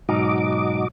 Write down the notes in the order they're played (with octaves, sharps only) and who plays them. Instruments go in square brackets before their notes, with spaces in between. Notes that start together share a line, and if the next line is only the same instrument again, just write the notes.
[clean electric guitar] B1 G#2 D#4 [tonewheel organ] F#4 D#5 D6